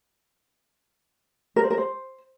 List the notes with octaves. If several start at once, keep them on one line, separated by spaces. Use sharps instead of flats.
A#4
C5
A#4
C5